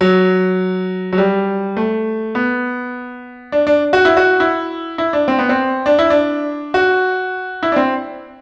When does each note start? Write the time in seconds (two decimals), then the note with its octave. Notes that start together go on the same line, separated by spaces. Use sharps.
0.01 F#3
1.13 F#3
1.18 G3
1.77 A3
2.35 B3
3.52 D4
3.67 D4
3.93 F#4
4.05 E4
4.17 F#4
4.40 E4
4.98 E4
5.13 D4
5.28 C4
5.39 B3
5.49 C4
5.86 D4
5.99 E4
6.10 D4
6.74 F#4
7.63 E4
7.72 D4
7.76 C4